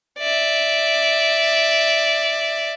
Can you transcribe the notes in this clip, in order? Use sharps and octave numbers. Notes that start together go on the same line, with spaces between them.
D5 E5